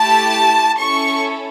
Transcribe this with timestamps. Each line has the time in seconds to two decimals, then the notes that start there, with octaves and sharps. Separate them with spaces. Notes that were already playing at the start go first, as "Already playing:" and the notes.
Already playing: A3 E4 G4 A5
0.79 C#4 E4 A4 C#6